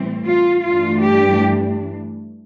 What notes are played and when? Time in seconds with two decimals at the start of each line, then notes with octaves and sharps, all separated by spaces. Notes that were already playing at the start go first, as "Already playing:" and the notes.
Already playing: A2 E3 G3 C4
0.27 F4
0.65 G2 E3 A3 D4 F4
1.05 G4